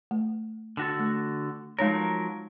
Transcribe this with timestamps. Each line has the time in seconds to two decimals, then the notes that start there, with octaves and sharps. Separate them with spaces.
0.11 A3
0.77 D3 F#4 A4
0.99 A3
1.79 F3 F#3 G#3 D#4 A#4 C#5